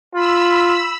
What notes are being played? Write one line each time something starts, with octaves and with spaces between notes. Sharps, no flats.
F4 B5 E6